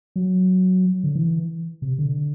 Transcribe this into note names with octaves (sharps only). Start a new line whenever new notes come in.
F#3
D3
E3
C3
D3